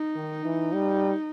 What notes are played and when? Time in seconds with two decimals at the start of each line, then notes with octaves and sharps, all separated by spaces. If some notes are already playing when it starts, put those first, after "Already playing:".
Already playing: D#4
0.16 D#3
0.45 E3
0.73 G3